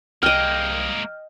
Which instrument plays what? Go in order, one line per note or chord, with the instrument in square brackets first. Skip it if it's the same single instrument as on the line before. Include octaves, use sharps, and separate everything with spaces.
[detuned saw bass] C2 [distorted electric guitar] G#3 A#3 [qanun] D#5 G5 [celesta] F6